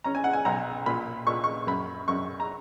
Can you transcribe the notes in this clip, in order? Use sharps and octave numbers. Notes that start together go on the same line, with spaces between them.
C#4 A#5
G#5
F#5
G#5
B1 A#5
A#2 B5
A#2 C#6
C#6
F#2 B5
F#2 C#6
A#5